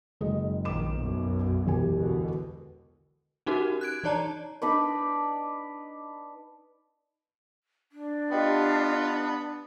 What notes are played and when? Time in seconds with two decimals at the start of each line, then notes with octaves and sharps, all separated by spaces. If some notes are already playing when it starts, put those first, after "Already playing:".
0.21 F#1 G#3 D#5
0.65 A#1 D#3 D6 E7
0.96 B1 F#2 B2
1.67 E1 G4 G#5
1.96 B2 D3
3.46 C#4 D#4 F#4 G4 A#4
3.81 F#6 G#6 D7
4.04 E3 D#4 C#5 D5 A5 A#5
4.62 D4 D#4 B4 D5
7.92 D4
8.31 B3 F4 G4 D#5 G5